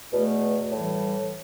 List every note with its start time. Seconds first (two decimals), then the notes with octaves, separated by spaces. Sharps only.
0.12 E2 B2 A3
0.70 A2 E3 G3